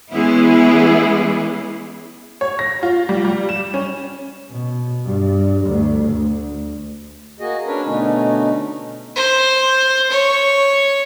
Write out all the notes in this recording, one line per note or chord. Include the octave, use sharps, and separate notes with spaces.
E3 G#3 B3 C#4 E4 G#4
C#5
A#6
F4
G3
G3
E7
C#4
B2
G2
D2
D2
A#3 F#4 G#4 D#5
C#4 D4 A#4 B4 C#5
B2 D3 A3 C#4 D#4
C5
C#5